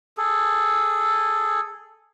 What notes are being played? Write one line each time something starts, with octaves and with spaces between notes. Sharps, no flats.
G#4 A4